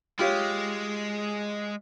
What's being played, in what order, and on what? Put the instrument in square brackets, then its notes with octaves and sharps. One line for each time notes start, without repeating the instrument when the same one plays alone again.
[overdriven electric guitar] G#3 [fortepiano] F4 G4 C#5